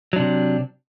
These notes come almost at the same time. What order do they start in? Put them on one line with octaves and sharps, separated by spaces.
F#3 D4 C3